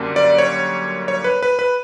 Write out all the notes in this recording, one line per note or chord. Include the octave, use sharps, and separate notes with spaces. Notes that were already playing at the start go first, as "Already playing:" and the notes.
Already playing: F#2 D3 G3 A#3
D5
C#5
C#5
B4
B4
B4